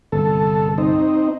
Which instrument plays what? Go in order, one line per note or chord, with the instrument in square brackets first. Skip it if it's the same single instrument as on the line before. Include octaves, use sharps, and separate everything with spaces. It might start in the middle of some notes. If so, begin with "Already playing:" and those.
[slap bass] G1 C2 [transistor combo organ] A4
[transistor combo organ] C4 D#4